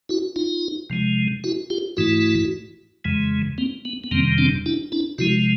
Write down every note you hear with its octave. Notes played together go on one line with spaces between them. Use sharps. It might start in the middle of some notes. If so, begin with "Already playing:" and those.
E4 F#4
D#4 F4
C3 F3 G#3
E4 F#4
F4 G4
G#2 E3 A3 E4 F#4
F2 C#3 E3 G#3
A#3 C4
B3
B3
F2 C3 D#3 G3 A#3 C4
C4 D4
D4 E4
D4 E4
C3 F3 G#3 E4 F#4